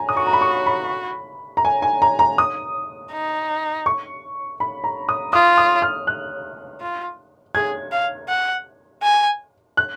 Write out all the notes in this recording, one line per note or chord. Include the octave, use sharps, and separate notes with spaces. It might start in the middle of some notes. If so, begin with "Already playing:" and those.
Already playing: G#5 A#5
D#6
F#4 C#6
A#5
B5
C#6
B5
A#5
G#5
G#5
A#5
A#5
D#6
D#4
C#6
B5
A#5
D#6
F4 D#6
D#6
F6
F#6
F4
G#4 G#6
F5
F#5
G#5
F#6